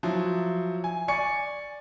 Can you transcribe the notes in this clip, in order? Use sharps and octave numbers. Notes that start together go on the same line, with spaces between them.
F3 F#3 E4
G#5
D5 G#5 C#6 C#7